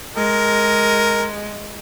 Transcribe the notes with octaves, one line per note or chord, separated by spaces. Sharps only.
G#3 A#4